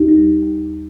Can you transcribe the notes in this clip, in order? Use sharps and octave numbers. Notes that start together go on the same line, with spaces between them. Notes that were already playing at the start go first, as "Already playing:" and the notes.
Already playing: D#2 D#4 G4
G3
D#2